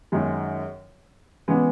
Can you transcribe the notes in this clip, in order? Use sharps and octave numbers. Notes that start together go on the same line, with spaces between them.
F#2 D#3 G#3
C#3 E3 G#3 B3